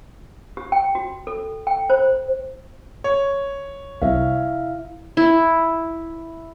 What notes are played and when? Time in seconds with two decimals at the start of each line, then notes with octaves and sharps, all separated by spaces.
0.57 G4
0.72 G5
0.95 F#4
1.27 A4
1.67 G5
1.90 C5
3.04 C#5
4.02 C2 E4 E5 F5
5.17 E4